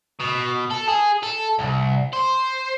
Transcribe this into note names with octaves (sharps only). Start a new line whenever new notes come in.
B2
A4
G#4
A4
C2
C5